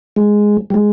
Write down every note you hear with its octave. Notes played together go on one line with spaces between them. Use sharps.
G#3
G3
G#3